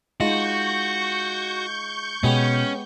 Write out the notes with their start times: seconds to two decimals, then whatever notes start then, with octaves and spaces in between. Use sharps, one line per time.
0.20 G#3 D#4 F4 F#4 C#6 G6
2.24 B2 G#3 B3 C#4 G4